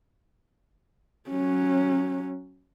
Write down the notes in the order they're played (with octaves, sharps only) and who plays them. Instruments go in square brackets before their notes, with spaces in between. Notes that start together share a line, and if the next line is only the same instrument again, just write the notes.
[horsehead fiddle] F#3 C#4